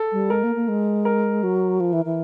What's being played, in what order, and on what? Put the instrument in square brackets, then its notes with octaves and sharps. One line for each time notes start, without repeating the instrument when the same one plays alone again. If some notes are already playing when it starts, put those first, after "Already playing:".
Already playing: [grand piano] A4
[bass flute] G3
[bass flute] G#3 [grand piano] A#4
[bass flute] A#3
A#3
G#3
[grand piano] A#4
[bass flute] F#3
F3
E3
E3